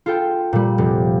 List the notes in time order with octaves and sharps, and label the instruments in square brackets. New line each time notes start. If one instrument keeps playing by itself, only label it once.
[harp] F4 A4 G5
A#2 G3
F1